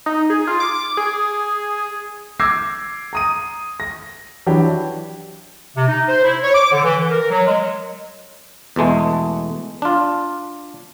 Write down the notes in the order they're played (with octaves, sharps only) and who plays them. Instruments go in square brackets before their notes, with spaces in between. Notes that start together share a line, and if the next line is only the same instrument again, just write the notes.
[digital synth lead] D#4
G#4
F4
D6
G#4
[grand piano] D6 E6 G6 G#6 A#6 C7
A#5 D#6 D#7
A#6
E3 F#3 D4 G4
[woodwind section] C3
D#4
C5
E4
C#5
D6
D3
E3
E3
A#4
F#3
G#3
[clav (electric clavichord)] E2 B2 G#3 A3
D4 F4